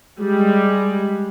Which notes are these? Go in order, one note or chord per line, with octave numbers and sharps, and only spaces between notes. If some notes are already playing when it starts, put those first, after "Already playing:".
G3 G#3